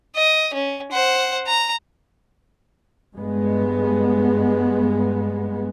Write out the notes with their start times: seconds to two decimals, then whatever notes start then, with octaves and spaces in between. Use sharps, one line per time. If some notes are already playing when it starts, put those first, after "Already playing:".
0.16 D#5
0.54 C#4
0.92 C5 F#5
1.47 A#5
3.16 G2 G#3 B3